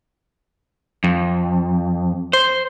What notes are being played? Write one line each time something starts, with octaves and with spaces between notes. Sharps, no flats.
F2
C5